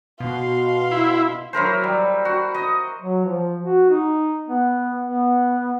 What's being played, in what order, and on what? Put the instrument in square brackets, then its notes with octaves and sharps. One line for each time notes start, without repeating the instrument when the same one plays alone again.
[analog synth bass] B2 [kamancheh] F5 C6
[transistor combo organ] E4
[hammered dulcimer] F#3 E4 A#4 C5
G3
F#4
D#5
[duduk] F#3
F3
F#4
D#4
B3
B3